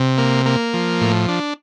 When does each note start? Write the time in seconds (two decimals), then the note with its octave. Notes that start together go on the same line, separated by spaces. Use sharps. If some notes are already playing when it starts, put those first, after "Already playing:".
Already playing: C3
0.18 A#3
0.46 A#3
0.73 F3
1.01 A2
1.28 D4